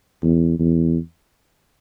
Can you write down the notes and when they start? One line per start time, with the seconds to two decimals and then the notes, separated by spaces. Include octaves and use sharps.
0.23 E2
0.59 E2